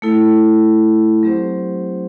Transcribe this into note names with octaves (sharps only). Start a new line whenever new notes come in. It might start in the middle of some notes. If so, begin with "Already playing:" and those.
A3 E4 A4
F#3 C4 G4 C5